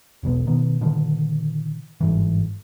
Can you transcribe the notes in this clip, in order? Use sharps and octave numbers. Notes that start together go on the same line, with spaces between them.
E1 B1 C#3 B3
B2 D#3 B3
A#2 D3 D#3 F3
G1 G#2 E3